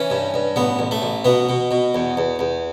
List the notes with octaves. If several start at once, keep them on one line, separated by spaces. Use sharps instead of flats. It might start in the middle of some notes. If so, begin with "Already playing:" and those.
Already playing: E3 C#4
G2
G2
A1 B3
A1
A3
A1
B2 B3
B2
B2
E2
E2
E2